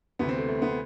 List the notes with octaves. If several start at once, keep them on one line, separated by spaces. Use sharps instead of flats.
D2 C3 E3 B3
C4
A3
A3
B3